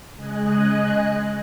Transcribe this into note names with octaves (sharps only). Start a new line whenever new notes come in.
C#3 G#3 D#5 G#5 F#6